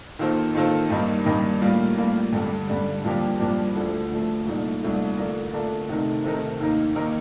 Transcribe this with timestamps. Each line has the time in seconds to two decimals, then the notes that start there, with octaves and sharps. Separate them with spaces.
0.19 D#3 A#3 F4 A4 C5
0.55 D#3 A#3 F4 A4 C5
0.90 G2 D#3 G3 A#3 D#4
1.26 G2 D#3 G3 A#3 D#4
1.61 A2 G3 A#3 F4
1.97 A2 G3 A#3 F4
2.33 G2 D3 G3
2.68 G2 D3 G3
3.04 G2 F3 A#3 D4 G4
3.39 G2 F3 A#3 D4 G4
3.75 D2 D3 F3 A3
4.11 D2 D3 F3 A3
4.46 C2 A#2 A3 D#4
4.82 C2 A#2 A3 D#4
5.18 D3 A3 D4 F4 A#4
5.53 D3 A3 D4 F4 A#4
5.89 C3 D#3 A3 D#4 A#4
6.24 C3 D#3 A3 D#4 A#4
6.60 D#2 D#3 A#3 D#4 A#4
6.95 D#2 D#3 A#3 D#4 A#4